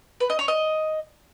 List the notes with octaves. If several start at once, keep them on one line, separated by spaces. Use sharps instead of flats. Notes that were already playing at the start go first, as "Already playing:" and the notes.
B4
D#5
C#5
D#5